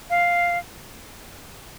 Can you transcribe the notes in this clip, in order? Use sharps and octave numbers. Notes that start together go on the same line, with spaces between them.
F5